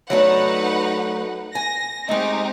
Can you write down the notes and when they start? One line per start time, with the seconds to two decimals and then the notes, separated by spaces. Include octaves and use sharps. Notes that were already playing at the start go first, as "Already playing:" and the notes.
0.10 F#3 A3 D4 D#4 B4 C#5 F#5
1.55 G#5 A#6
2.09 G#3 A3 C4 D#4 G4 D#5